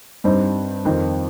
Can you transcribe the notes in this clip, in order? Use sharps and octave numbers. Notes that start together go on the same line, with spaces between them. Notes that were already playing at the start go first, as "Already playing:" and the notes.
G2 G3 C4 D#4 C5
F2 D#3 C4